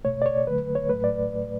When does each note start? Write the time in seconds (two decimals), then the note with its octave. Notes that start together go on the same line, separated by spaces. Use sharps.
0.04 B2 A3 C#5
0.22 D5
0.26 C#5
0.47 D3 F#3 A3 B4
0.75 C#5
0.89 A2 F#3 A3 B4
1.04 D5